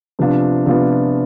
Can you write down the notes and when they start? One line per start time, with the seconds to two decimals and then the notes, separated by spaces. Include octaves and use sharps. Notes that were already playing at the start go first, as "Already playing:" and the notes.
0.19 C3 F3 B3 D4 F4
0.66 C3 F3 B3 D4 F4